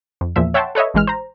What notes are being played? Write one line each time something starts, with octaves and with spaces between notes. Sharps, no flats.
F2
E2 A#2 F3 E5
C#5 E5 F#5 G5 A5 C6
A4 B4 C#5 D#5 E5
A1 E3 G#3 F6
C5 A#5